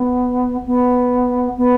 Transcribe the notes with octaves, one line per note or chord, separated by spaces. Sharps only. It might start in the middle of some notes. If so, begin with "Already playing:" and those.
Already playing: B3
B3
B3